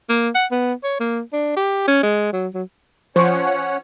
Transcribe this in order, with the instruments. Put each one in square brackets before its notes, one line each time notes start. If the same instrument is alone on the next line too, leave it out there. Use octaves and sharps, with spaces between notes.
[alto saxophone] A#3
F#5
B3
C#5
A#3
D4
G4
C#4
G#3
F#3
F#3
[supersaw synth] F3 [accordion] C#4 C#5 F#5 [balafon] F4 C#6 [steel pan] C5